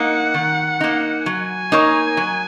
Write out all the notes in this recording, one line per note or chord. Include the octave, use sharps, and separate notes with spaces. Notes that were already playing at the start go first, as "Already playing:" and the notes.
Already playing: A#3 D#4 F#5
D#3
A#3 D#4
F#3 G#5
A#3 D#4 A#4 C#5
F#3